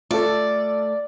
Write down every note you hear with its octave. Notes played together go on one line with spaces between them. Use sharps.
A3 F4 A4 D5